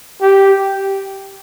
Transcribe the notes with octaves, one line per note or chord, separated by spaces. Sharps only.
G4